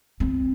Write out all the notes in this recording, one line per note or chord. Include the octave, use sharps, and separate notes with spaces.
C4